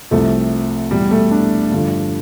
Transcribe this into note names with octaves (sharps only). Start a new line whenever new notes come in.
C2 C3 F3 A3
E2 B2 G3
A3
D4
G2 D3 F3